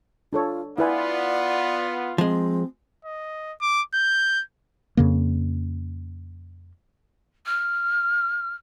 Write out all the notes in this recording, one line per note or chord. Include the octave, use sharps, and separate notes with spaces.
D4 F4 A4 C#5
B3 E4 F4 B4 D5 G#5
F3 G#3 C4
D#5
D6
G6
F2 C#3 A#3
F6